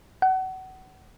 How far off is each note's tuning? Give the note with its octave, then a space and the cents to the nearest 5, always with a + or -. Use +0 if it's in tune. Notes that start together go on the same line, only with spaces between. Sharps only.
F#5 +30